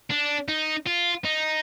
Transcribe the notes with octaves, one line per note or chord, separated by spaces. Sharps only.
D4
D#4
F4
D#4